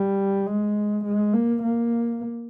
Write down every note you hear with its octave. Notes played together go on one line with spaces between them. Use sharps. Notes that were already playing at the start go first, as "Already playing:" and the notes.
Already playing: G3
G#3
G#3
A#3
A#3